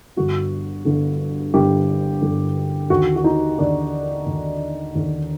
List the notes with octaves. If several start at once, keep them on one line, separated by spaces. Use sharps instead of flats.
G1 G2 D3 F#4
G1 G2 D3
G1 G2 D3 G4
G1 G2 D3
D#2 D3 F#4
F#4
D#4
D#2 D3 D4
D#2 D3
D#2 D3